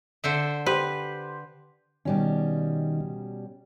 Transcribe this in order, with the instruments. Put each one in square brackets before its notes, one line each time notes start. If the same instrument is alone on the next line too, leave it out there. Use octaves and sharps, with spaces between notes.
[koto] D3 C5 E5
[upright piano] G4 C5 [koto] B4
[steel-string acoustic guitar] B2 G3 C#4 [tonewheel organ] D#3